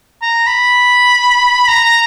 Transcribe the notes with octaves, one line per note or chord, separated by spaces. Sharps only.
A#5
B5
A#5